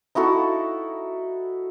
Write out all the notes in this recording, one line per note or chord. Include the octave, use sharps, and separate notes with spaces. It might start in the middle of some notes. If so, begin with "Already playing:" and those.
D#4 E4 F#4 A4